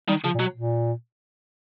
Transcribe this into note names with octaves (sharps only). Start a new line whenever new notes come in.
D#3 G3
C#3 F3
A#2
B2 F#3
A#2